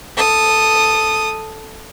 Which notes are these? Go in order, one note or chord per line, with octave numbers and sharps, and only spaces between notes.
A4 D#6